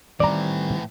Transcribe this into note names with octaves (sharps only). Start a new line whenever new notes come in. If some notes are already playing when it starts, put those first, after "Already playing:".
A2 D#3 E3 G3 C4 D5 A#5